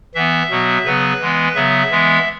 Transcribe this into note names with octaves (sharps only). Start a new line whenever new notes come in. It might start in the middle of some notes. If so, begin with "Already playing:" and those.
E3 B3 E5
B2 F#3 B3
C#3 F#3 B3 B4
E3 G#3 B3
C#3 F#3 B3 E5
E3 G#3 B3